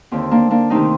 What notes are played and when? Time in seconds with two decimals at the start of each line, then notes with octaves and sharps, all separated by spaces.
0.12 D#2 D3 C4
0.31 A#3 D4
0.51 A#3 D4
0.70 D2 C3 D#3 C4 D#4